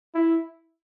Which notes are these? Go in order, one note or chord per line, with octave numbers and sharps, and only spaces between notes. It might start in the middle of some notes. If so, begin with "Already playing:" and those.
E4